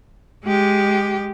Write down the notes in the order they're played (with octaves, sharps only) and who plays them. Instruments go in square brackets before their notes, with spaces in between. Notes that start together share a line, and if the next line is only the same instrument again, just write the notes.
[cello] G#3 G4